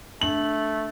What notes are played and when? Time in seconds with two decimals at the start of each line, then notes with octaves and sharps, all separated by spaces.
0.22 A3 D4 F#7